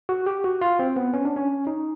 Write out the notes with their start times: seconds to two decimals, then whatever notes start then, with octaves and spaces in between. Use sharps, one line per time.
0.09 F#4
0.26 G4
0.44 F#4
0.61 F4
0.79 C4
0.96 B3
1.14 C#4
1.25 D4
1.36 C#4
1.67 D#4